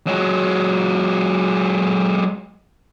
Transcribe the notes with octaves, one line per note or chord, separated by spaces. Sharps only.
F#3 G#3